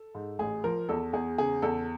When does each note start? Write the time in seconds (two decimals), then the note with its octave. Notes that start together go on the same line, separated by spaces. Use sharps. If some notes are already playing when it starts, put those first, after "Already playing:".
Already playing: A4
0.15 G#2
0.39 A1 G#4
0.64 F3 A#4
0.89 E2 A4
1.13 E2 G#4
1.38 C#3 G#4
1.62 E2 A4